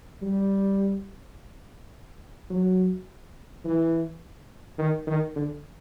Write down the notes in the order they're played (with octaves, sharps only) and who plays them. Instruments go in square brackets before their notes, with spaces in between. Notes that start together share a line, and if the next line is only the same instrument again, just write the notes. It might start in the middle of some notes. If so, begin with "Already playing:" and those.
[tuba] G3
F#3
E3
D#3
D#3
D3